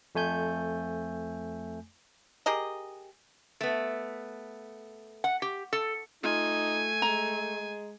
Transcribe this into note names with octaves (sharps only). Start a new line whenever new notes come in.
F2 A3 G#5 G6
G4 G#4 A#4 D#5
A3 B3
F#5
G4
A4
A3 D#4 F4 G#5
G#3 A#5